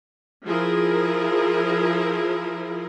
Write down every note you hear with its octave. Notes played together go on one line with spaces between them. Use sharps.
F3 E4 G#4 A#4